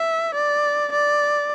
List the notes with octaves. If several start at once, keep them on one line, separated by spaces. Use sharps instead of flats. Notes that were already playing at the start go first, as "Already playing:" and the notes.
Already playing: E5
D5
D5